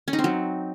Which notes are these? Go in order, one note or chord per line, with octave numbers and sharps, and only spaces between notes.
C#4
D#4
C4
F#3